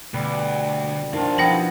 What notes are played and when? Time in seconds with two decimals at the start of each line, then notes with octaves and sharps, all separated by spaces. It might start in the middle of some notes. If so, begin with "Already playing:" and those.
0.14 D2 B2 G3 G4 B4
1.13 D#3 F3 D4 F4 F#4 F5
1.38 F3 B3 D#4 E4 G5 A#6 F#7